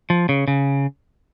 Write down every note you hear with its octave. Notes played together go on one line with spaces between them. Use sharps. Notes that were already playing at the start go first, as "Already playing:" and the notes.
F3
C#3
C#3